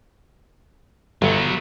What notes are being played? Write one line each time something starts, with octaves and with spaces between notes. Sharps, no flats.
G1 F#3 B3